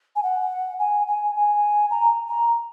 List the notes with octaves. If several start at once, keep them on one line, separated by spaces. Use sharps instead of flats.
G#5
F#5
G#5
G#5
G#5
A#5
A#5